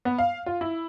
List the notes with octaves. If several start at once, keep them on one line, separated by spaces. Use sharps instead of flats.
B3
F5
F4
E4